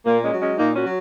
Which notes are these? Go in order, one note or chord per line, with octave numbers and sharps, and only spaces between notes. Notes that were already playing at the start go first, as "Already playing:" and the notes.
A#2 A#3
G#3 C#4
F#3
G#3 C#4
A#2 A#3 D#4
C#4 F#4
F#3